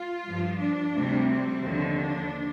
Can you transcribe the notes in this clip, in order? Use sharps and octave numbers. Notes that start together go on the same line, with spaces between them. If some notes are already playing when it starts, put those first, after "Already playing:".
Already playing: F4
G2 F3
D4
D2 C3 G3
C4
D#2 D3 F3
D4